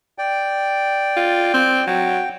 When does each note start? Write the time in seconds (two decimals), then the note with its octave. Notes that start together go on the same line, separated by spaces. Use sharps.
0.18 D5 G5
1.16 F4
1.54 C4
1.87 F#3 G5